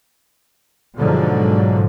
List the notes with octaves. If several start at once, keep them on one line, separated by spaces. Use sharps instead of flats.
G#2 B2 D3 F3 F#3